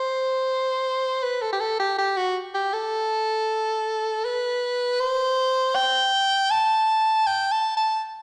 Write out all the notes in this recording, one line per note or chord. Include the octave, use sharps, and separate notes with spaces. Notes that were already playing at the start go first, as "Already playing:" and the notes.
Already playing: C5
B4
A4
G4
A4
G4
G4
F#4
G4
A4
B4
C5
G5
A5
G5
A5
A5